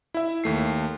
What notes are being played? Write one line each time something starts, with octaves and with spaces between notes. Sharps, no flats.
E4 E5
D#2 A3 C7